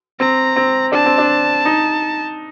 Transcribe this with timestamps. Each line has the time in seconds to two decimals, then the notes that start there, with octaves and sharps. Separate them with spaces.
0.20 C4 A#5
0.56 C4
0.92 D4 A5
1.06 C4
1.18 D4
1.65 D#4